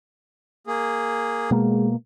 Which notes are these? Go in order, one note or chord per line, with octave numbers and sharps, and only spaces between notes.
A#3 G#4
B2 G#3 A#3